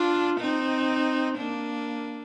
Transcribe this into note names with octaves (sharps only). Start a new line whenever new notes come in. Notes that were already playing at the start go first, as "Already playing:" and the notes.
Already playing: D4 F4
C4 D#4
A#3 D4